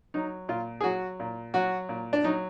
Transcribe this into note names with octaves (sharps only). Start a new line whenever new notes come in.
F#3 D#4
A#2 F4
G#4
F#3 F#4
A#2
F#3 F#4
A#2
D4
F#3 D#4